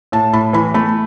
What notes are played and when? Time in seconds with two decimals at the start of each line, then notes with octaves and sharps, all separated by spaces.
0.12 A2 A5
0.33 A2 B5
0.53 E3 B5
0.74 A3 B5